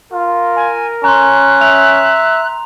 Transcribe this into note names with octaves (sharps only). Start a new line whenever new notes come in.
F4 A#4
G#5
C#4 A#5 C6 F#6
E5 F7